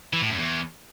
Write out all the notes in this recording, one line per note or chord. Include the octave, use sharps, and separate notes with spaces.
E3
A2
F#2
E2